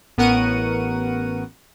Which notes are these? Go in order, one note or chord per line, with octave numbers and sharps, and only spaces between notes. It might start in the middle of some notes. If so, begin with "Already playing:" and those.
A1 B3 A#4 F#5 C#6 D#7